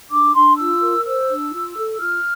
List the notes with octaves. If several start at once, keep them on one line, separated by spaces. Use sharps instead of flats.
D4 D6
D4 C6
F4 E6
A#4
C5 E6
D4
F4
A4
F4 F6